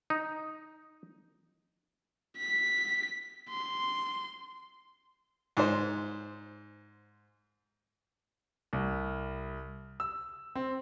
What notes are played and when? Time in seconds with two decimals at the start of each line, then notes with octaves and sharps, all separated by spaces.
0.10 D#4
2.37 B6
3.49 C6
5.57 G#2 C5
8.73 C2
10.00 E6
10.55 C4